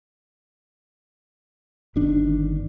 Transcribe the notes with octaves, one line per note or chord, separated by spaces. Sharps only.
G1 D#3 D4